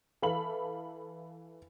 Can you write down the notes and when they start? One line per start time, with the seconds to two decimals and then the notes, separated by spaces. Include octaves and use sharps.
0.22 E3 A4 F5 B5 F#7